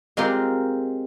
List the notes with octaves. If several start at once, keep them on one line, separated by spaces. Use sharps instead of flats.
G#3 C4 F4 G4 A#4